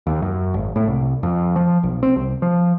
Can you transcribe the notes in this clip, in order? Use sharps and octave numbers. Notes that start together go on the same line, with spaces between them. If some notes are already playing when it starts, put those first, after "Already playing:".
D#2
F#2
G#1
A2
C2
F2
F3
B1
C4
C2
F3